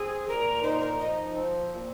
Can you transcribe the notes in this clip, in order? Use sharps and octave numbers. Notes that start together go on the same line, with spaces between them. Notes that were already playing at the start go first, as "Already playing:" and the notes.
Already playing: C4 G#4
A#2 A#4
D#4 C5
A#4
F3 D#5
C4
A#2